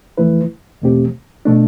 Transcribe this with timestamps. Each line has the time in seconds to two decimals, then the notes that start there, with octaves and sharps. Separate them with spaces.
0.18 F2 E3 A3 E4 B4
0.82 E2 B2 A3 C4 G4
1.45 B2 A3 D4